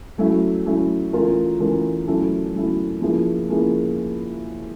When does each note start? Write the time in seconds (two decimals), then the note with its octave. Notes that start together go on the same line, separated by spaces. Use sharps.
0.18 F#3 A3 C#4 E4
0.66 F#3 A3 C#4 E4
1.13 E3 A3 C#4 F4 A#4
1.60 E3 A3 C#4 F4 A#4
2.07 F#3 A3 C#4 E4 A4
2.54 F#3 A3 C#4 E4 A4
3.02 F3 A#3 C#4 E4 G#4
3.49 F3 A#3 C#4 E4 G#4